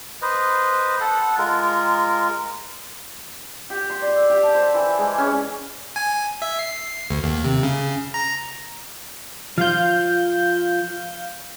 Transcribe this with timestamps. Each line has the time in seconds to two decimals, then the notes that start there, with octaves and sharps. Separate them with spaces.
0.22 B4 C5 D#5
1.00 A4 F#5
1.38 G#3 F4 A#4
3.70 G4
3.90 C6
4.02 D5
4.16 E5
4.30 G4
4.43 A5
4.55 C5
4.74 E3
4.98 G#3
5.18 C#4
5.96 G#5
6.42 E5
6.59 C7
7.10 D2
7.23 D#2
7.44 C3
7.63 C#3
8.14 A#5
9.58 F3 F4 F5 G6